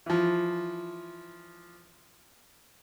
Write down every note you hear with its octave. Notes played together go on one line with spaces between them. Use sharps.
E3 F3